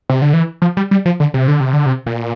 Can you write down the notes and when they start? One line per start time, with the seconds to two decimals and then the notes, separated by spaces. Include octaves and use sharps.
0.10 C3
0.22 D3
0.33 E3
0.62 F3
0.77 G3
0.91 G3
1.05 F3
1.20 D3
1.34 C3
1.48 D3
1.60 C3
1.73 D3
1.86 C3
2.06 A#2